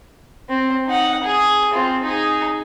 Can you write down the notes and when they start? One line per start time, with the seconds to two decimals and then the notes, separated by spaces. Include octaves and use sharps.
0.49 C4
0.87 D#4 F#5
1.24 G#4
1.73 C4 F4
2.03 D#4 G#4